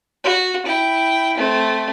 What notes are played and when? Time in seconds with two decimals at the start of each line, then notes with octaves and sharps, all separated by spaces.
0.24 F#4
0.66 E4 G5
1.37 A3 C4